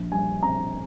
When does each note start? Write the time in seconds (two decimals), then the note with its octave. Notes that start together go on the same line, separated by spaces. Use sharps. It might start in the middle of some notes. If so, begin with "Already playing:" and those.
Already playing: A#1
0.12 G3 G#5
0.43 C4 A#5